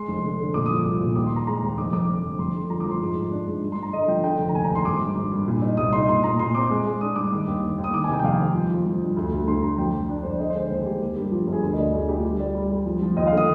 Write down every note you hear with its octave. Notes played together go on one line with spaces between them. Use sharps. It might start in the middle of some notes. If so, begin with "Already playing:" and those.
Already playing: G#3 C6
F1
D3
D3
A#2 D6
F3 D#6
D6
C2
A#2
D#2 D6
C6
D#2 A#5
G#3 A#5
D#2
F1 D6
F2 D6
D3
F2
F2 C6
D3
F3 A#5
D6
F3
C6
G#2
G#2
D4
G#2
G2
C6
G2
A#5
D3 D#5
F3 G5
D3 G5
F1
A#5
D#2 G#5
A#5
D#2 C6
G#1 D6
G2
G#1
G2
A#2
D#4
C2 D#6
D#4 C6
A#2 C6
A#2 A#5
A#2 C6
C4 D6
G#3
G#3
D4 D#6
G2 D6
D#3
D#2
D#2
D#2
D#6
D#3 D6
G#5
C3 G5
G5
F2 F5
D#3
F3
F3
F3
G2
D2
D2
D2 C6
D2 A#5
F2 G5
F2
D4
F2 C5
D5
D3 D#5
C5
G#3
C5
D#2 C5
G#4
G#3 G4
A#3
G2 G4
F3 F4
G1
G#4
D2 A#4
D#5
D2 D5
D2 G#4
D2 G4
F4
G3 G4
G3 D5
G3
G3
F3
F3
D#2 D#5
F5
D3
D#6